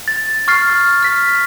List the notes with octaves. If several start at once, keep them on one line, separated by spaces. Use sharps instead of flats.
A6
C#6 F6 A6 C7
F6
F6 B6